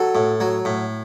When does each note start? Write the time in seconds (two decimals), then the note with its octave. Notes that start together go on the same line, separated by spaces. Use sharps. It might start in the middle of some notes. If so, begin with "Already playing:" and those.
Already playing: F#3 A4
0.15 A2
0.40 F#3
0.65 A2